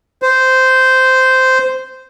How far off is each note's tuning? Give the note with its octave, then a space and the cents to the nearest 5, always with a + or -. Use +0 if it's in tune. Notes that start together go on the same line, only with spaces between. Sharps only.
C5 -10